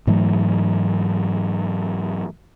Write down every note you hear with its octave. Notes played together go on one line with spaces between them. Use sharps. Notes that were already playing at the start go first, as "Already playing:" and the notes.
G#2 E3 F#3 A3